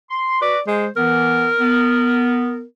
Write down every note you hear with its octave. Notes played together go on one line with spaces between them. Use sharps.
C6
F#4 B4 D5
G#3 C5
E3 B3 A#4
B3